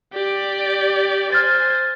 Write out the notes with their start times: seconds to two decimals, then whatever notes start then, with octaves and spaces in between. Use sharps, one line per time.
0.13 G4 D5
1.32 C5 G#5 F6 A6